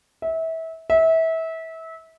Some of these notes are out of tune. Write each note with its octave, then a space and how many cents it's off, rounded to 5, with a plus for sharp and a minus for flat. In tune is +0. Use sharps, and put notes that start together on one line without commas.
E5 -25
E5 -25